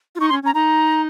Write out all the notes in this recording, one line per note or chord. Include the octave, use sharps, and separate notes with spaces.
F4
D#4 C#6
C6
C#4
C#4 A#5
D#4 A#5